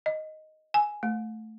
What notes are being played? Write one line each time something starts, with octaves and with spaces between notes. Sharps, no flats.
D#5
G#5
A3